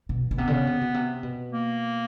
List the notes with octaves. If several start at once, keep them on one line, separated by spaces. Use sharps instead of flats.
B2
B2
C3 B3
D3
C#3
C3
B2
C3
B2
A#3